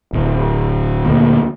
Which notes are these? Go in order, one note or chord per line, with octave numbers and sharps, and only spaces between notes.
D1
D2 A#2